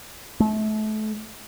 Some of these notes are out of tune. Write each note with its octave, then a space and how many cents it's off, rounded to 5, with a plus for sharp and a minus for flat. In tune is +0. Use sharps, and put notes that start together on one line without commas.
A3 -30